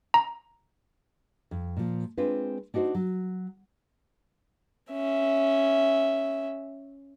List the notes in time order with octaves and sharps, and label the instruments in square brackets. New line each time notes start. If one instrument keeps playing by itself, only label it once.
[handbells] A#5
[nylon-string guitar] F2
A#2 F3
G#3 C4 D4 F4 G#4 B4
D4 D#4 F#4 B4 C5
F#3
[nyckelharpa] C#4 E5